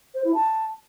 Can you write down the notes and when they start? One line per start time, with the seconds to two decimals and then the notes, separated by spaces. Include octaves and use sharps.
0.14 C5
0.24 E4
0.34 A5